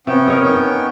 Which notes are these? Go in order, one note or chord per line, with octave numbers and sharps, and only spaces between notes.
C3 B3 C#4 G5
A#4 C#5 D#5
D#4